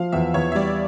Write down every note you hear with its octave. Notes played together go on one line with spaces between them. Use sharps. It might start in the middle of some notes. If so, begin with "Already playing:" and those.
Already playing: F3 F5
E2 E5
E2 C#5
E5
G3 D5